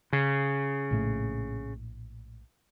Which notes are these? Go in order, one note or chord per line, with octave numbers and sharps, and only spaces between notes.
C#3
A#1 A2 A3